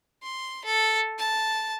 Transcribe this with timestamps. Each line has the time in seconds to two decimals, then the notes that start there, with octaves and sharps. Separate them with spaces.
0.23 C6
0.65 A4
1.19 A5